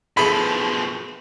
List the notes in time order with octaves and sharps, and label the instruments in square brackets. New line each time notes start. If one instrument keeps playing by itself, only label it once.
[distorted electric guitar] B2 F3 [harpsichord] E4 G#4 A4 [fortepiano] B5